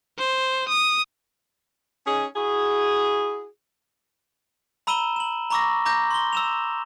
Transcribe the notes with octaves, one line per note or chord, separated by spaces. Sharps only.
C5
D#6
C#4 D#4 G#4
E4 F#4 G#4
A#5 B5 E6 D#7 E7 G7
E7 F#7
A#5 B5 C#6 D6 E6 A#6
A#5 D6 G6 A#6
C6 G7
E6 E7 F7